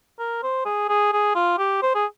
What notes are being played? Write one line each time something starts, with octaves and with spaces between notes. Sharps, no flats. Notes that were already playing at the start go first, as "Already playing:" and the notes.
A#4
C5
G#4
G#4
G#4
F4
G4
C5
G#4